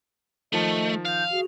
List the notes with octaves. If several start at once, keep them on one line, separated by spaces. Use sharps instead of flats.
D#3 F3 A3 D#5 A5
F5 G6
F#4 G#4